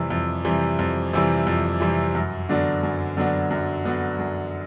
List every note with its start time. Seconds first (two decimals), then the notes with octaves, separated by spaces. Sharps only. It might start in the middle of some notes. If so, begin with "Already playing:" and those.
Already playing: F2 C3 E3 G3
0.10 F2
0.45 C3 E3 G3
0.79 F2
1.13 C3 E3 G3
1.47 F2
1.80 C3 E3 G3
2.15 F#2
2.49 D3 F#3 B3 D4
2.83 F#2
3.17 D3 F#3 B3 D4
3.51 F#2
3.85 D3 F#3 B3 D4
4.20 F#2